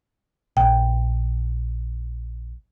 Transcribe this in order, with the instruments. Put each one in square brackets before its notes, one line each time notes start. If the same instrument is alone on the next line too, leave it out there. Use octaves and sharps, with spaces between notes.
[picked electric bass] A#1 [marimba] G5